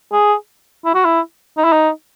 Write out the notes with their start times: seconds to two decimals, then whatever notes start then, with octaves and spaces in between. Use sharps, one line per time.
0.12 G#4
0.85 E4
0.94 F#4
1.05 E4
1.57 D#4
1.64 E4
1.73 D#4